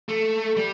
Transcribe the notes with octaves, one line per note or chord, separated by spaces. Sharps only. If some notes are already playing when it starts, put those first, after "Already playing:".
A3
G3